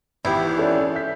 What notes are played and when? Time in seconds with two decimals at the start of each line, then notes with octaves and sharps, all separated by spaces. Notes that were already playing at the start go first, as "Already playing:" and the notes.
0.25 G#1 E3 B3 E4 G4
0.57 C#4 A4 D5
0.95 E5 G6 B6